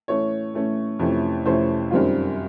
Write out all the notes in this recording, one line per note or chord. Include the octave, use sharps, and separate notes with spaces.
A2 E3 A3 C#4 C#5
A2 E3 A3 C#4
F2 C3 E3 A3 C#4
F2 C3 E3 A3 C#4 C5
F#2 D#3 G3 C4 F4